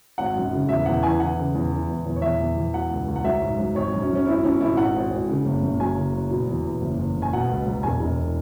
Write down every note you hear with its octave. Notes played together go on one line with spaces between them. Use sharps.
G#1 F#5
F#2
C#3
E2 E5
E2 F#5
E3 G#5
E3 F#5
C#3
E2
E3
E2
E2
C#5
E2 E5
E2
E2
F#3 F#5
C#2
C#2
F#5
F#3 E5
G#2
F#3
G#1 C#5
F#2
C#4
F#2
C#4
G#1 E4
G#1 C#4
G#1 E4
G#2 F#5
G#1
G#1
C#3
F#1
F#1
F#3 G#5
C#3
F#3
B2
E2
E2
F#1
F#1
F#1
G#5
B2 F#5
C#2
F#3
E1 G#5
E1